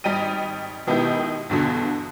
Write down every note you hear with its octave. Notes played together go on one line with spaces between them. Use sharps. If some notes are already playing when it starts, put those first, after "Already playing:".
G#1 G3 D#5 G5 D#7
B2 D#3 G#3 B3 E4 G4
E2 G2 B2 D3